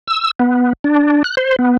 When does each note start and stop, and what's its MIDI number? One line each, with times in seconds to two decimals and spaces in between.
0.07 0.31 88
0.40 0.73 59
0.84 1.23 62
1.24 1.35 90
1.37 1.56 72
1.59 1.77 59